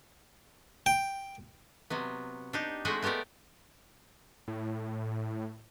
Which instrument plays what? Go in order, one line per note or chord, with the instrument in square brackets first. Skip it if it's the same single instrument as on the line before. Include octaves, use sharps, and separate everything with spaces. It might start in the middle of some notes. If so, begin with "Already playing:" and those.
[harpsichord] G5
[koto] C3 F#3 B3
D4 D#4 G4
G#3 A3 C4 F#4 D#5 E5
A3 B3 G4 A#4 D5
[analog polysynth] A2